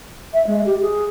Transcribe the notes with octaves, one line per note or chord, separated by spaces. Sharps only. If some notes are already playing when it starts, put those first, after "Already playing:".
E5
G#3
G4
G#4